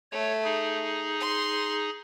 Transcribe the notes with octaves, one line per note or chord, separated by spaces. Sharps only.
A3 C#5
D#4 G#4
C6